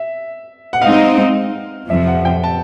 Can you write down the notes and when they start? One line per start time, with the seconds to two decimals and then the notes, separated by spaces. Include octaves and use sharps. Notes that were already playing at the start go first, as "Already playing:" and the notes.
Already playing: E5
0.73 F#5
0.82 G#3 C4 D#4 F5
1.90 F2 C3 F3 E5
2.07 F#5
2.25 G5
2.44 A5